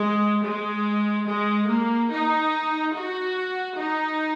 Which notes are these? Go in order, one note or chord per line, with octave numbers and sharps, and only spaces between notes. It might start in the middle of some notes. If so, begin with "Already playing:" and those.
Already playing: G#3
G#3
G#3
A#3
D#4
F#4
D#4